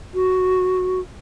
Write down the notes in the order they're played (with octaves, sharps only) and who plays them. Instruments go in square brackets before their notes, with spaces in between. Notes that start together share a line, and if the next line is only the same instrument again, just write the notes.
[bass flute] F#4